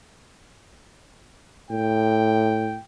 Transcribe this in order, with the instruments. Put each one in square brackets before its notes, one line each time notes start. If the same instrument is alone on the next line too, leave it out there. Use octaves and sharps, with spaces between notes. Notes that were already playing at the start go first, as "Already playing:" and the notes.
[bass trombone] A2 [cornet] G5